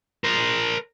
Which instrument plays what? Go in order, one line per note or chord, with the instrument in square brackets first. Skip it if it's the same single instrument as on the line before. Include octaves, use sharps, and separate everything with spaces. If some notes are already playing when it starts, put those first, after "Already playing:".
[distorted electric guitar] A#4 C5